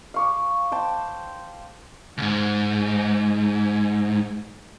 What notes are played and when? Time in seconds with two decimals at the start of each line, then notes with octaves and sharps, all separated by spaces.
0.14 F5 C#6 D6
0.72 C5 G5 A5
2.18 C#2 G#2